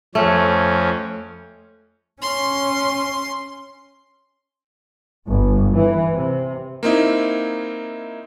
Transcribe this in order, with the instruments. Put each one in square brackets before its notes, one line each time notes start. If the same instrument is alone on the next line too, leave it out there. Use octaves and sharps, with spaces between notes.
[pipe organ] F2 C#4 [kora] A3
[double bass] C#4 [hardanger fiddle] C6
[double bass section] G1
E3
C3
[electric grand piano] A#3 C4 D#4 E4